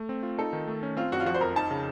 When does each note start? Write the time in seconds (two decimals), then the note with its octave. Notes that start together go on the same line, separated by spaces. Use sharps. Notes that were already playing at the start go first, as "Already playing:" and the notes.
Already playing: A3
0.09 C4
0.23 F4
0.38 D#4 A4
0.53 D#3
0.68 A3
0.83 C#4
0.97 C4 F4
1.12 F#2 F#4
1.20 F4
1.26 F3 F#4
1.34 C5
1.41 F2 A#4
1.56 D#4 A5
1.71 C#3